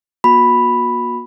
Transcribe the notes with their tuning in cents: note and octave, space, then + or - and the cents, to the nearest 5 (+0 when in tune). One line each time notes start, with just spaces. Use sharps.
A#3 +45 F#4 -35 B5 +0